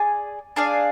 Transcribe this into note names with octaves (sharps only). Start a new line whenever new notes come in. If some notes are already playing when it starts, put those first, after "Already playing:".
Already playing: G#4 D5 G#5
D4 G#4 D5 F5